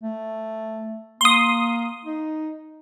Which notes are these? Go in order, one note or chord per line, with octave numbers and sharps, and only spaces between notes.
A3
A#3 C6 D#6
D#4